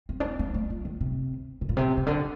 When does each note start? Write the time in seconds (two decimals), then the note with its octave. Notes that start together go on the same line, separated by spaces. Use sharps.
0.09 C4
0.20 D4
0.24 C4
0.39 A#3
0.54 A3
0.70 F3
0.85 D#3
1.01 C3
1.61 C3
1.69 A#2
1.77 C3
1.97 C3
2.07 D3